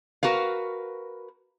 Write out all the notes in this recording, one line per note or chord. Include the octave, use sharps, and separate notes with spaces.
F#4 A#4 B4 F5